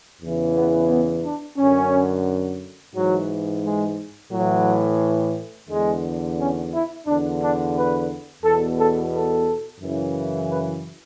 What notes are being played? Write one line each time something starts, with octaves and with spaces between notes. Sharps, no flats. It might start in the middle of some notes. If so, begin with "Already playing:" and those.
E2 C#3 E3
B3
B3
D4
F#2 D3 C#4
G#2 E3 F#3
G#3
A2 E3 F#3
E2 D3 G#3
C#4
E4
E2 D3 D4
D4
B4
E2 B2 A4
A4
A4
F#2 C#3 E3
B4